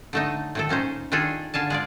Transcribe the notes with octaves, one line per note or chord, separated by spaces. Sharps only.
D3 A3 D#4
A2 D#3 A4
A#2 C#4 D#4 C5
D#3 D4 D#4 F4 G#4 A4
D3 F5 G#5 A5
G#3 F4 D5